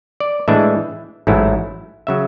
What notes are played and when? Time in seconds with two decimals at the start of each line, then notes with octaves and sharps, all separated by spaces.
0.20 D5
0.48 A2 E3 G#3 D4 E5
1.27 A1 G#2 F#3 A3 E4
2.07 C#3 F#3 E5